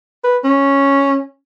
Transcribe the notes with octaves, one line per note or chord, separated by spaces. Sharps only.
B4
C#4